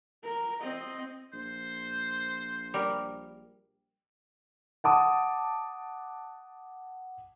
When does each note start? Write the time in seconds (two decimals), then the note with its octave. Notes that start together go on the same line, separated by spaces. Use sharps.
0.24 A#4
0.61 C4 D#5
1.33 A#1 C5
2.74 G3 A#4
4.84 F#5 A5 D6 D#6